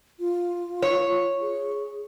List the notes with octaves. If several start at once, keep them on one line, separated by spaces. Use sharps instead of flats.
F4
C#5
G#4